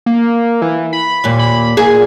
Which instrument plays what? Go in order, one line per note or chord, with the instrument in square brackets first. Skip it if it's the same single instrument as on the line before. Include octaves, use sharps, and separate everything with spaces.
[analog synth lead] A#3
E3
B5
[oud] D#2 A#2
[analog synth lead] B5
[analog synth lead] A#2 [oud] G#4